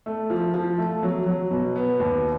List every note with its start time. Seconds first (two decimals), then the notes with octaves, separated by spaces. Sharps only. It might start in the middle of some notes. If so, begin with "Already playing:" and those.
0.06 A3
0.30 F3
0.54 F3
0.78 A3
1.03 F#3
1.26 F#3
1.51 B2
1.76 B3
2.00 D#2